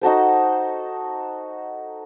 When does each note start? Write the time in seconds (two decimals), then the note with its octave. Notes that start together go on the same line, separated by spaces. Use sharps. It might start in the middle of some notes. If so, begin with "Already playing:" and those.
0.02 D#4 F#4 A4 C5